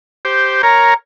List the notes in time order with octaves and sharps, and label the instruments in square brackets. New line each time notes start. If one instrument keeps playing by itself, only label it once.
[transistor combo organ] G4 C5
[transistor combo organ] A#4 C#5 [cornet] A#5